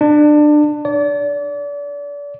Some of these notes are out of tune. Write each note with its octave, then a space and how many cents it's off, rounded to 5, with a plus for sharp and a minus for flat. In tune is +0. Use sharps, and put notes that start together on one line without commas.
D4 +25
D5 -35